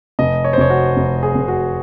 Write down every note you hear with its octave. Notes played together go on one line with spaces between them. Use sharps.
F1 D#5
C#5
C5
F1 C#5
F#4
F1
G#4
F1
F#4